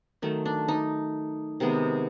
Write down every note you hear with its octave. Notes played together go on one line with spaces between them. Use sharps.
D#3 F#3 A3
D4
D#4
C3 D#3 G#3 B3